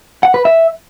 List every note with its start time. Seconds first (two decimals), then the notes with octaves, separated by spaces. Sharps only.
0.23 F#5
0.34 B4
0.45 E5